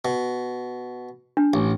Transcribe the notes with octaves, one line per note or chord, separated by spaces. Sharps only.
B2
D4
A1